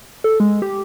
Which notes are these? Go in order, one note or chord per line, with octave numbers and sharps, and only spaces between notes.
A4
G#3
G4